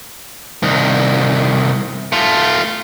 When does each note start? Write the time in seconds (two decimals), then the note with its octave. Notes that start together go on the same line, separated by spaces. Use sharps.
0.63 C2 D#3
2.12 A3 F4